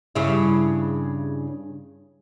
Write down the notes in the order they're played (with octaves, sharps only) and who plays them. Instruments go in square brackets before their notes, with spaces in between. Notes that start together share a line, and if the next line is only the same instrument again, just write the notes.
[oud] G2 C#3 E4